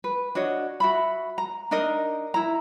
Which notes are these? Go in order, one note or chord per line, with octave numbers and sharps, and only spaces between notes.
B4
D4 F#4 C#5 D#5
F#4 E5 B5
A#5
D4 D#4 A#4 D#5
E4 A#5